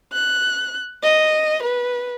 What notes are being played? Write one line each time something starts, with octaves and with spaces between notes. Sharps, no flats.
F#6
D#5
B4